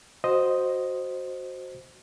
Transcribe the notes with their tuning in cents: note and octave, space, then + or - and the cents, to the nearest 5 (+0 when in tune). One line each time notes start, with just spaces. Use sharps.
F#4 +0 C5 +0 D#5 +0